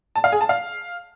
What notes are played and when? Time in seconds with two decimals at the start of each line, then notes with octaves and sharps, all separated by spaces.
0.16 A5
0.24 F5
0.32 G#4
0.41 A5
0.49 F5